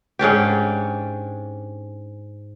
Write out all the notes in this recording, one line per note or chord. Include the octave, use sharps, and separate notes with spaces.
G#2 C#4 D4 G4